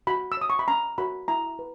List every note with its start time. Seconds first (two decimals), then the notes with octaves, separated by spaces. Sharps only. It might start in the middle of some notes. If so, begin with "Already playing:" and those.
0.07 F#4 B5
0.32 E6
0.37 C#5 D#6
0.50 C#6
0.59 B5
0.68 C#4 A#5
0.98 F#4 A#4 C#5 B5
1.28 E4 A#5
1.59 B4